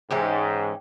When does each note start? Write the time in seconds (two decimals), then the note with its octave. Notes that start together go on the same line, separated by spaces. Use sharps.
0.11 G#2 E3 C#4 G4